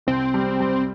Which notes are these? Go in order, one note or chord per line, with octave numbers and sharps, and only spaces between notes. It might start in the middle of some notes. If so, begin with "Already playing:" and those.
C2 C4
G3
G3